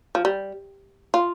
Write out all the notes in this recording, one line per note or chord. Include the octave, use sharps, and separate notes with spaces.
F3
G3
F4